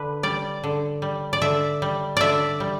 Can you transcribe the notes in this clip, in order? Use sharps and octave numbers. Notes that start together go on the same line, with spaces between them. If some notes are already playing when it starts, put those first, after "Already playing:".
Already playing: D3 B4
G3 D5
D3
G3
D5
D3 E5
G3
D3 D5 E5
G3